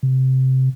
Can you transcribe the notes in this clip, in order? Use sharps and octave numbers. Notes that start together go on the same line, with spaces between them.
C3